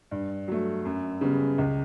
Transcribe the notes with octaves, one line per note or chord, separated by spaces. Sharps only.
G2
F#3 A3
F#2
C#3 G3 B3
C#2